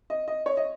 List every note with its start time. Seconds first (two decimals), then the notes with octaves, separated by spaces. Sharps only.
0.10 D#5
0.28 D#5
0.46 C#5
0.57 D#5